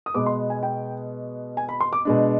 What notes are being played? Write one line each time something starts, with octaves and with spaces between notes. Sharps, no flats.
D#6
B2 G#3 B3 D6
C6
G#5
G5
G#5
B5
C6
D6
B2 G#3 D4